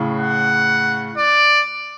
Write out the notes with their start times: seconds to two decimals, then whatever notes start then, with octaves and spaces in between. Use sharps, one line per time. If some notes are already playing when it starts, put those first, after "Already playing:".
Already playing: A2 C#3
0.20 F#5
1.17 D5